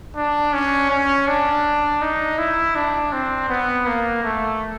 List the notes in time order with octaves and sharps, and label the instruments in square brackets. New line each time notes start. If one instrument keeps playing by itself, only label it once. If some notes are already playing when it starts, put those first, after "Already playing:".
[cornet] D4
C#4
C#4
D4
D#4
E4
D4
C4
B3
A#3
A3